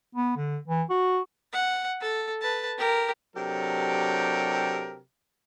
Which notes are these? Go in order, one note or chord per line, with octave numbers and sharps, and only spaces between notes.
B3
D3
E3
F#4
F#5
A4
B4 A5
G4 A#4
C3 F#3 D4 G4 A4 A#4